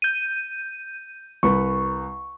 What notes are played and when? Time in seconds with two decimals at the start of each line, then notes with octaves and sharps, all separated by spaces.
0.02 G6 D#7
1.43 C2 B4 C#6